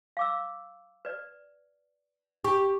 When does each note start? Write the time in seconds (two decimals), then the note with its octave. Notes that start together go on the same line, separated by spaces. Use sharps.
0.17 F5 D6 E6
1.05 B4 D5
2.44 G4 C#6